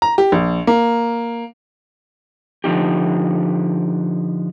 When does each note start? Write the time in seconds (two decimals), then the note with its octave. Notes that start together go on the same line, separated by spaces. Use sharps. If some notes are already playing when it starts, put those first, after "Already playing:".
0.02 A#5
0.18 G4
0.32 A#1
0.67 A#3
2.64 D3 F3 A#3 D#4 G4